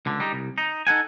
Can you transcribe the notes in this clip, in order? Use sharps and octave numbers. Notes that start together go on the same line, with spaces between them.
C#2 D3
G3 D#4
C2
D#4
D#4 A4 F#5 G#5